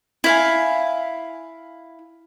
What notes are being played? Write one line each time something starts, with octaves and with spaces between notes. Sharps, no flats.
E4 F5 G#5